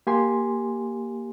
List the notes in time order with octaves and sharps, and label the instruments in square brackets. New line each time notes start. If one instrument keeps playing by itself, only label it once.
[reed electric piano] A#3 G4 G#5 C6